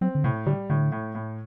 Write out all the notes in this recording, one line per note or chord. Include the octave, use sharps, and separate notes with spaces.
F#3 C4
D3
A2 C3
D3 G3
A2 D3
A2
A2